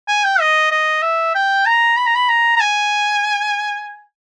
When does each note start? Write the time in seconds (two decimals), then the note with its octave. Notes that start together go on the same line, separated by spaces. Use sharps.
0.08 G#5
0.24 G5
0.40 D#5
0.72 D#5
1.02 E5
1.35 G5
1.66 A#5
1.97 B5
2.06 A#5
2.15 B5
2.29 A#5
2.56 A#5
2.61 G#5